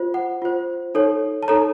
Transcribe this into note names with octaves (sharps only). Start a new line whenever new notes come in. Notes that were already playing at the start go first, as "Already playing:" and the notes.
Already playing: F4 C5
F#5
F4 C5
D#4 A4 C#5
A5
D#4 A4 C#5 A#5